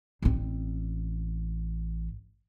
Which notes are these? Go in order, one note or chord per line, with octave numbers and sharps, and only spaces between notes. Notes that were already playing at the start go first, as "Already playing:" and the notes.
A1 C4